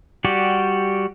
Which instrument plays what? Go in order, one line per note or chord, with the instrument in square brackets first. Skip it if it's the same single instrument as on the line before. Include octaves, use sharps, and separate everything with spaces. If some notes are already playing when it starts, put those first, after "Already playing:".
[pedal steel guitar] G3 F#4 G4 D5